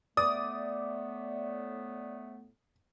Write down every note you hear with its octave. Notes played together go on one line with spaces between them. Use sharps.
A2 A3 B3 D5 D#6